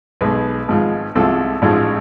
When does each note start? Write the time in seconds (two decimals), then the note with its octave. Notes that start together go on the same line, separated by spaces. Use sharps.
0.21 B1 B2 G#3 B4
0.68 G#1 G#2 F3 G#3
1.15 C2 C3 F3 G#3 A4
1.62 A1 G#2 F3 G#3